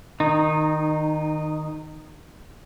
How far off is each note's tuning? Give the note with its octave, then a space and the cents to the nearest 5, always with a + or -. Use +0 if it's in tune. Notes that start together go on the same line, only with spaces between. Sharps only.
D#3 +0 D#4 -25